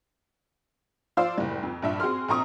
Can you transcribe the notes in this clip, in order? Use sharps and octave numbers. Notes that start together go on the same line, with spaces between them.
F3 C5 D5 F5 E6
F#1 A2 G3
F2
A#1 G2 E5
C4 F#4 G#4 C6 F6
A#1 C4 A#5 C#6 D#6